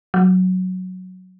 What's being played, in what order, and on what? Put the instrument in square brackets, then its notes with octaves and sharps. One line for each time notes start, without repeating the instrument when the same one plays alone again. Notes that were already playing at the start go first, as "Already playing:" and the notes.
[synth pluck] F#3